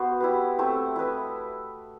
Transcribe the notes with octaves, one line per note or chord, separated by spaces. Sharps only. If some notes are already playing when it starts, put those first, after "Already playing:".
Already playing: B3 F#4 C5 D#5
E4 G4 B4
A3 C4 E4
E4 B4 D#5